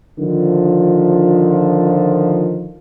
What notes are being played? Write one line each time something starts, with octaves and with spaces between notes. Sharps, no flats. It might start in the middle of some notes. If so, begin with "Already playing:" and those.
D3 D#3 F3